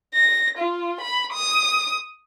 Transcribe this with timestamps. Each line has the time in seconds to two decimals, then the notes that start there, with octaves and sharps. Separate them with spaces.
0.15 A#6
0.58 F4
1.01 B5
1.33 D#6